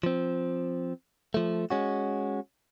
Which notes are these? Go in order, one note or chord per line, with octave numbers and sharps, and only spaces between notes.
F3 C4
F3 A3
G#3 C#4 F#4